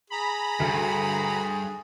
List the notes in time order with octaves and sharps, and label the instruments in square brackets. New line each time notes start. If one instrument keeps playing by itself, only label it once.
[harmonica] G#4 [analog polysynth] A#5 B5
[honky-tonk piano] D2 [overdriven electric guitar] G2